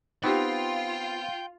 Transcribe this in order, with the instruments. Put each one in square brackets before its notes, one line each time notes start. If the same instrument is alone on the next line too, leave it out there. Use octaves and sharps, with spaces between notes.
[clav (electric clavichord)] B3 C4 [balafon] D#4 G4 [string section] F4 [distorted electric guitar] G5